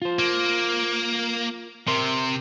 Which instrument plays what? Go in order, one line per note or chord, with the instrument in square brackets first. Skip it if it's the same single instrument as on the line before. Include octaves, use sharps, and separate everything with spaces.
[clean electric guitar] F4 C5
[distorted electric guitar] A#3
[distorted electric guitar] C3 [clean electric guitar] A#4 C6